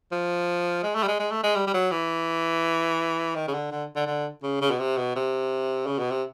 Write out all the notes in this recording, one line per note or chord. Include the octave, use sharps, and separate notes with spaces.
F3
G#3
A3
G3
G#3
G#3
A3
G#3
G3
G3
F#3
E3
D#3
C#3
D3
D3
D3
D3
C#3
C#3
B2
C3
B2
C3
C#3
B2
C3